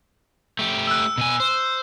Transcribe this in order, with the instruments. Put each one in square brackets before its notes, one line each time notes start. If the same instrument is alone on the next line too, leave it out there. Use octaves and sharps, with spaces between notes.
[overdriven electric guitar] A3 G4
[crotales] E6 F#6
[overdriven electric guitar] B2 G#5
C5